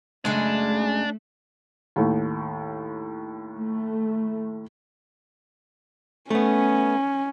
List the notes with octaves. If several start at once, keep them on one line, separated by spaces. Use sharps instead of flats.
F#2 C#3 G#3 A3 D4
D#2 A2
A3
A3 B3 C#4